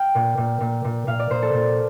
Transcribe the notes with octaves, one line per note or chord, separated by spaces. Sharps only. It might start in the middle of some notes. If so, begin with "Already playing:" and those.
Already playing: F5 G5
A#2
A#2
A#2
A#2
A#2 F5
D5
A#2 C5
A4
A#2